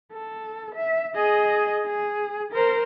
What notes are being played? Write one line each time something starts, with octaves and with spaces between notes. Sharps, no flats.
A4
E5
G#4 D#5
G#4
A#4 C5